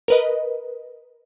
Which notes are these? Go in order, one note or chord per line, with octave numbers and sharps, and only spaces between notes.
A#4 B4 D#5